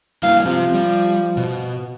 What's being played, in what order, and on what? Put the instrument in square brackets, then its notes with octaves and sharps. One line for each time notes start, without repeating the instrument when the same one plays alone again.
[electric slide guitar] G3 A#3 E4 [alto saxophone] F5
[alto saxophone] F3 [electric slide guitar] C4 G4
[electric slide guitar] G3
B2